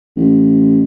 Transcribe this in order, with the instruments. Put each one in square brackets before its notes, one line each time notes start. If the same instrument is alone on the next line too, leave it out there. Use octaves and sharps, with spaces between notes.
[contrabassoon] A1